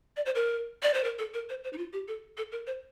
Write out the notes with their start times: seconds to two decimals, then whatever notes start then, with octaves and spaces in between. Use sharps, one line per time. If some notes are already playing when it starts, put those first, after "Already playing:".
0.17 D5
0.26 C5
0.35 A#4
0.83 D5
0.94 C5
1.04 A#4
1.19 A4
1.34 A#4
1.49 C5
1.64 C5
1.73 D#4
1.78 F4
1.93 G4
2.08 A4
2.37 A4
2.52 A#4
2.67 C5